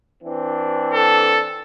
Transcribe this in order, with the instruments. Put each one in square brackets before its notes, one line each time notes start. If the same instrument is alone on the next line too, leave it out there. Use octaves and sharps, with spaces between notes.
[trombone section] E3 C4 D4
[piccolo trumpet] A4